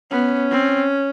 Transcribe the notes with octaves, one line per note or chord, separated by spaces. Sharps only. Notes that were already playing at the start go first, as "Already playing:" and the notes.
B3 C#4
C4